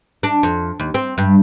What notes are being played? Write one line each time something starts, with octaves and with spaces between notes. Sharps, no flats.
D4
F2
D#2
C4
G2